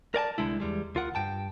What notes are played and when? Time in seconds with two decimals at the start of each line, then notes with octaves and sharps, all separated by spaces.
0.14 A#4 D5 G#5 A5
0.38 C2 D3 G#3 E4
0.60 E2 G3 G#3
0.95 D2 F4 A#4 F#5
1.15 G2 G5 A5